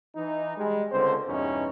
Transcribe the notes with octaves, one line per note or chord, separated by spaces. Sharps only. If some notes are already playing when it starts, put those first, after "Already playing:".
E3 D#4
G3 G#3
C#2 D3 C4 C5
E2 G2 B2 C#4 D#4